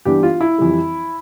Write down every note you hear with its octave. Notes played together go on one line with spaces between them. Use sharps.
G2 E3 B3 D4 G4
F4
E4
F2 E3 G3